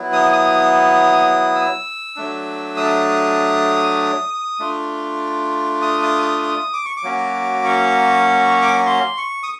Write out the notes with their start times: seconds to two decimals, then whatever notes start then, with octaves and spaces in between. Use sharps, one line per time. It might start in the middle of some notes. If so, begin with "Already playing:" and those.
Already playing: F#3 B3 E4
0.13 D#6
0.33 D#6
1.55 E6
2.16 F#3 A3 D4
2.77 D#6
4.59 A3 D4 F4
5.82 D#6
6.02 D#6
6.22 D#6
6.42 D#6
6.73 D6
6.86 C#6
6.97 D6
7.03 F#3 A#3 C#4 F#4
7.65 C#6
8.62 D6
8.74 C#6
8.86 C6
9.18 C#6
9.43 D#6